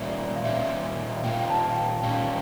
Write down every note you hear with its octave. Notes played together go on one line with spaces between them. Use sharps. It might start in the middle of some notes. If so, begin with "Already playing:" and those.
Already playing: A#2 G3 A#3 C#4 D5 E5
F5
A#2 G3 A#3 C#4 E5
A#2 G3 A#3 C#4 G5
F5
G5
A5
F5
G5
A#2 G3 A#3 C#4 F5